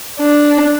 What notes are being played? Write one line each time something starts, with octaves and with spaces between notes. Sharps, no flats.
D4